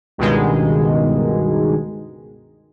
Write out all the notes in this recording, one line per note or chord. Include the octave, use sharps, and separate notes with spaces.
C#2 G2 B2 D#3 G#3